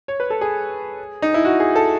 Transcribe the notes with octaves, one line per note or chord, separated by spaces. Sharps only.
C#5
B4
A4
G#4
D#4
E4
F#4
G#4
A4